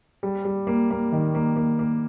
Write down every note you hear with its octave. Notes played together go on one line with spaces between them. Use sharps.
G3
G3
A#3
A#3
D#3
A#3
A#3
A#3